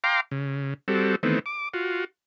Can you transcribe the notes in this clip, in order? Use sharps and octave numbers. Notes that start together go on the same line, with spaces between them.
F5 G5 A#5 C6 D6
C#3
G3 C4 F#4 A4
D#3 E3 A3 B3 C4
D6
F4 F#4